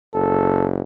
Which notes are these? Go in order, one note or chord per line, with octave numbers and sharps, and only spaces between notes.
F#1 A4